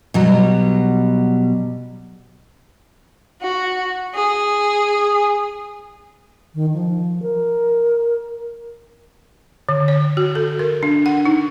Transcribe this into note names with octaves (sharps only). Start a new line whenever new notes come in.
B2 F#3 G3
F#4
G#4
D#3
F3
A#4
D3
C#5
F#4
A4
A#4
D4
F#5
D#4